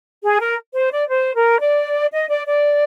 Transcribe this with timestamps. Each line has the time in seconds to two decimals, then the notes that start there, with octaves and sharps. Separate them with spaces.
0.23 G#4
0.40 A#4
0.74 C5
0.92 D5
1.09 C5
1.35 A#4
1.61 D5
2.12 D#5
2.29 D5
2.47 D5